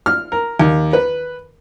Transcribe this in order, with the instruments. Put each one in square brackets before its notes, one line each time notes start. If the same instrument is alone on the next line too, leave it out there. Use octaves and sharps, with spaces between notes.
[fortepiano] F6
A#4
D#2
B4